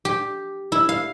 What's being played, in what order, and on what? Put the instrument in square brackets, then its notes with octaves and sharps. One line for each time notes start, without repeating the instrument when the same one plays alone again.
[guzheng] G4
E4
F5